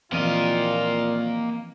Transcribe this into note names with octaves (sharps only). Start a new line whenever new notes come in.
A#2 E3 F3 A#3 C4 F4 D#5